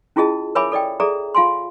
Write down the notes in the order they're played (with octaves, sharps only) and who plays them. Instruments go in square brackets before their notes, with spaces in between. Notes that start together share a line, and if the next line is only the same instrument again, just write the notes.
[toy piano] C#4 E4 F4 G#4 D#5 A5
A#4 C#5 E5 G#5 B5 D6
A4 D5 D#5 G5
G#4 A4 D5 E5 A#5
F4 F5 G#5 C6